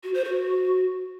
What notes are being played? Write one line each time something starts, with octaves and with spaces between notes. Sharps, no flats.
F#4
C5
F#4